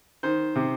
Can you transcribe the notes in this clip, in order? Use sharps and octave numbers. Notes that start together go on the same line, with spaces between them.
D#3 C5
C3